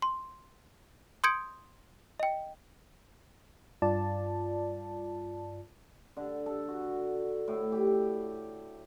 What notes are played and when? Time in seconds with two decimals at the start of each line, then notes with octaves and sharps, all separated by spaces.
0.02 C6
1.24 C6 D#6 G6 G#6 C#7 D7
2.20 D#5 G5
3.82 G2 F4 D5 A5
6.17 D3
6.46 A4
6.68 F#4
7.48 A2
7.72 G4